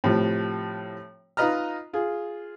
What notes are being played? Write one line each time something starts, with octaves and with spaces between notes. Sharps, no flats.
A2 C3 F3 G3
D#4 F4 B4 D#5 A#5 F6
F4 G#4